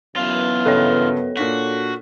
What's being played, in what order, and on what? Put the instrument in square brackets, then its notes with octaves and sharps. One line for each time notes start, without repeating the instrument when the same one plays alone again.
[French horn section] F#2 B3 [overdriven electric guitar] E3 F4
[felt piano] G2 C#3 [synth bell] A4 C#5
[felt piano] A#2 D4 B6 [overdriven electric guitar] F#4